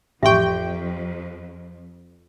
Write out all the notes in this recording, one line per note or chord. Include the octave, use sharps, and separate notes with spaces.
A1 F2 G4 E5 G5 C6 C#6